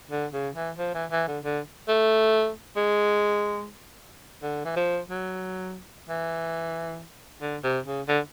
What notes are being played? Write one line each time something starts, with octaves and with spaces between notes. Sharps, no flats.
D3
C#3
E3
F3
E3
E3
D3
D3
A3
G#3
D3
E3
F3
F#3
E3
D3
C3
C#3
D3